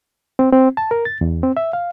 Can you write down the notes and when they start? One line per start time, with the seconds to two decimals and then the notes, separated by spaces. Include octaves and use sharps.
0.39 C4
0.52 C4
0.77 A5
0.91 A#4
1.05 A6
1.21 E2
1.43 C4
1.57 E5
1.73 F5